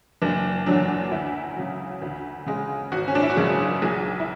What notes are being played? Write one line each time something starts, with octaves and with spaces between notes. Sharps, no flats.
F#1 D4
E2 D3 F#3 D4
D2 E4
C#3 F#3
D2
C#3 G#3
G#1 F#4
C#4
D4
E4
F#4
F#2 C#3 G#3 G#4
B1 G#4
E4